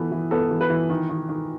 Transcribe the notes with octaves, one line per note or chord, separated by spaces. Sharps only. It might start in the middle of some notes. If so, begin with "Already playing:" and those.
Already playing: E3 B3 A4
E3
B3 A4
E3
B4
E3
D#3
D#3
D#3